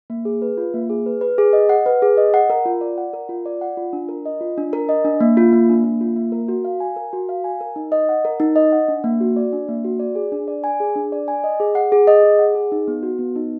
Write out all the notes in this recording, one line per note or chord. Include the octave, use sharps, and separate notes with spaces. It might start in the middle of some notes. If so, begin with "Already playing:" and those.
A#3
G#4
B4
F4
A#3
G#4
B4
B4
G#4
D#5
F#5
B4
G#4
D#5
F#5
A#4
F4
D5
F#5
A#4
F4
D5
F#5
F4
D4
A#4
D#5
F4
D4
A#4
D#5
D4
A#3
F4
A#3
D4
A#3
F4
A#3
A#4
F#4
F5
G#5
A#4
F#4
F5
G#5
A#4
D#4
D#5
F#5
A#4
D#4
D#5
F#5
D4
A#3
F#4
D5
D4
A#3
F#4
D5
G#4
D4
D5
G#5
G#4
D4
D5
G#5
D#5
G#4
F#5
G#4
D#5
G#4
F#5
G#4
D#4
B3
F#4
B3
D#4